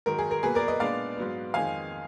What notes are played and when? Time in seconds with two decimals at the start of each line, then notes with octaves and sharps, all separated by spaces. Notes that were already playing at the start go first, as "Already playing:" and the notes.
0.06 G#2 D#3 F#3 A#4
0.19 G#4
0.31 A#4
0.43 B2 F#3 A#3 G#4 B4
0.55 A#4 D5
0.68 B4 D#5
0.80 A#2 G#3 B3 D4 D5 F5
1.17 G#2 F#3 B3
1.54 F2 D#3 G#3 F5 G#5